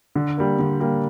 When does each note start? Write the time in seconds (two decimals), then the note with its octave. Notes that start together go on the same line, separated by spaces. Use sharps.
0.15 D3
0.38 G3 A#3
0.59 D3
0.80 G3 A#3